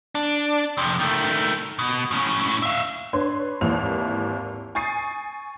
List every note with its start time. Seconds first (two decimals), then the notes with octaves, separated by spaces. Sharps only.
0.15 D4
0.78 F2 C3
1.00 D#3 A3
1.79 B2
2.11 A2 C#4
2.62 E5 F5
3.13 D4 B4 C#5 C6
3.61 G#1 D#2 E3 F7
4.75 G#5 C#6 D#6 A6 C7 D#7